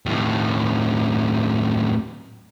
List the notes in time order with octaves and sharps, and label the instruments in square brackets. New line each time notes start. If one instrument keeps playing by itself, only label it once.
[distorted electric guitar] D#2 A2